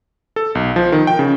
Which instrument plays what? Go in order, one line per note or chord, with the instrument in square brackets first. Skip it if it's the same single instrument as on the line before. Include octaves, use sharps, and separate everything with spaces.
[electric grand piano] A4
B1
F3
D#3
G5
C#3